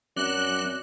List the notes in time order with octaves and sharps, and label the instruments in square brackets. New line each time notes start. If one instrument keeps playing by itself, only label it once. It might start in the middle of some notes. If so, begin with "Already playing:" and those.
[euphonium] F#2 [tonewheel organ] F#3 C4 [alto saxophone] D5 [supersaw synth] F#6